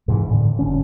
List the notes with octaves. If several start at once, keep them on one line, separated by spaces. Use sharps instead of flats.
G#2 C3 D#3 E3
A2 D3
G1 G2 D3 C#4